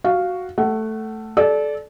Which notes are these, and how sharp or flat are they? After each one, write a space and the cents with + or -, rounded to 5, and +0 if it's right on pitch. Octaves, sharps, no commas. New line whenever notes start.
F#4 +0 F5 +0
A3 +0 F#5 +25
A4 -25 D5 +0